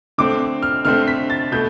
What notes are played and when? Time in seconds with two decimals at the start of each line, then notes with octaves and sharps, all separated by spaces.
0.18 D3 A3 C4 D6
0.63 F6
0.85 D3 A3 C4 F6
1.08 B6
1.30 A6
1.52 B2 A3 G6